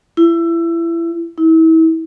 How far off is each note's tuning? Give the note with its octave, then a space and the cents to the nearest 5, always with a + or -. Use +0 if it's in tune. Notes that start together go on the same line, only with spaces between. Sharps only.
E4 +25
E4 -35